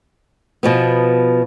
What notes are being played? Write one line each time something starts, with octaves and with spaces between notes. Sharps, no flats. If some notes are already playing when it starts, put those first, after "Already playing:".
B2 F3 B3